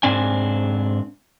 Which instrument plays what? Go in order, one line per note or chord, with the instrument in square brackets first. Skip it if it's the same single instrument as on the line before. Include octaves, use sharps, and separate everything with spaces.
[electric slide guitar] G#2 C4 D4 G#5